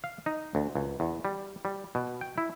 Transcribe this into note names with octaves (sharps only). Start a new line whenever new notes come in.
F5
D#4
D2
C#2
E2
G3
G3
B2
G5
E4